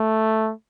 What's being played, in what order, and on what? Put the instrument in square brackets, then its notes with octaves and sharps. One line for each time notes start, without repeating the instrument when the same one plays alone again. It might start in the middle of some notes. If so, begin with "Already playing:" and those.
Already playing: [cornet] A3